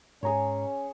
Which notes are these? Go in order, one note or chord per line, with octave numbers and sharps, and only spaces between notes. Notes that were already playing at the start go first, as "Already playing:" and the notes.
G#2 C#4 G#4 C#5 A#5